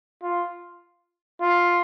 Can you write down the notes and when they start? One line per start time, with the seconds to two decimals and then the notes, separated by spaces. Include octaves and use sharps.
0.22 F4
1.41 F4